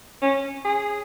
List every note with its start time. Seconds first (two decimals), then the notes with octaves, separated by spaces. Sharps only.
0.22 C#4
0.65 G#4